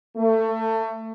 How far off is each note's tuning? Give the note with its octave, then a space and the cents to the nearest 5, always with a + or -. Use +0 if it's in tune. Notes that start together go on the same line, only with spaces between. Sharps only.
A3 +25